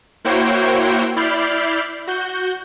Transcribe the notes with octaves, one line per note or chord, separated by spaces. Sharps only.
A#3 E4 F#4 C5 C#5 G5
E4 D5 B5 F6 G6 C7
F#4 G6